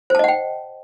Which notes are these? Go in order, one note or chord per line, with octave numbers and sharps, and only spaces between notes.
C5 D#5 F#5 G5 A5